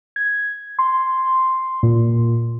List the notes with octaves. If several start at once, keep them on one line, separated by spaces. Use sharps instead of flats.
G#6
C6
A#2